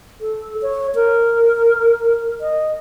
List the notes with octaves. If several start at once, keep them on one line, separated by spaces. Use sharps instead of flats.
A4
C#5
A#4
D#5